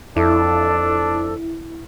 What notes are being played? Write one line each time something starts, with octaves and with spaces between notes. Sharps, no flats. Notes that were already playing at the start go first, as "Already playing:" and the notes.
F2 D4 E4 A4